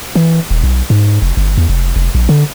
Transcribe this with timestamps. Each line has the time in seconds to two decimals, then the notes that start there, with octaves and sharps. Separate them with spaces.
0.15 E3
0.51 D#1
0.63 B1
0.90 G#2
1.22 F1
1.37 G1
1.57 E2
1.69 F1
1.96 F1
2.15 A#1
2.29 D3